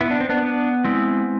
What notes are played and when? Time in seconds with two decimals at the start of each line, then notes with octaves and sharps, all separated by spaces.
0.01 B3 E4
0.11 D4
0.20 C4
0.29 B3 D4
0.42 B3
0.84 G#3 C4 E4